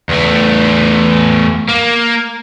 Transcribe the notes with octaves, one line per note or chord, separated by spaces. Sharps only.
E2 A3
A#3